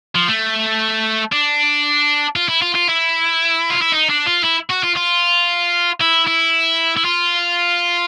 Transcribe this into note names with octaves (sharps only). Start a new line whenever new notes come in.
F3
A3
D4
F4
E4
F4
F4
E4
F4
E4
D#4
D4
F4
E4
F#4
F4
F4
E4
E4
E4
F4